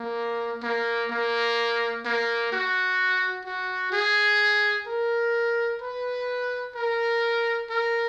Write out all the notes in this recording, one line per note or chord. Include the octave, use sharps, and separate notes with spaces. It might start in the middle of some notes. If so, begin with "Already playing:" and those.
Already playing: A#3
A#3
A#3
A#3
F#4
F#4
G#4
A#4
B4
A#4
A#4